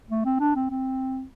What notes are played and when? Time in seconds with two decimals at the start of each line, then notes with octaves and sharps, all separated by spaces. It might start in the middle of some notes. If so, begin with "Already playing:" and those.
0.10 A3
0.25 C4
0.40 D4
0.56 C4
0.70 C4